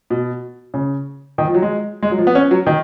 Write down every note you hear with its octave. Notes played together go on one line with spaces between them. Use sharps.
B2
C#3
D#3
F3
F#3
G#3
G#3
F#3
F3
B3
C#4
F#3
D#3